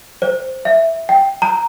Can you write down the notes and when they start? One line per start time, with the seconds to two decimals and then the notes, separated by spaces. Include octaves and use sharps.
0.22 C5
0.65 E5
1.09 G5
1.42 A#5